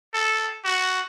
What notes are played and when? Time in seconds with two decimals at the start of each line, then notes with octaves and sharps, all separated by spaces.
0.14 A4
0.65 F#4